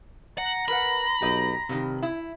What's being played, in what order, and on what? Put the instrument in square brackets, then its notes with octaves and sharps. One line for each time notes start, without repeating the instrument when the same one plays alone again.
[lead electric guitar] F#5 [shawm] A#5
[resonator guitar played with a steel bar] A#4 B4 F#5 [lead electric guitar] B5
[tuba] B1 [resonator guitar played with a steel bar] G4 D#5
[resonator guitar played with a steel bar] G2 D#3 [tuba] C3
[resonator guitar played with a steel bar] E4